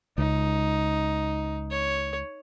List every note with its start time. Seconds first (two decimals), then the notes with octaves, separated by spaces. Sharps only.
0.18 C#2 D#4
1.71 C#5